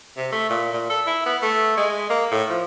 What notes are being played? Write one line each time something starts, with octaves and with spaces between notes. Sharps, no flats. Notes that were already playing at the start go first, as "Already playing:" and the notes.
C3
A3
A#2
A#2
A4
E4
B3
A3
G#3
A#3
A2
F3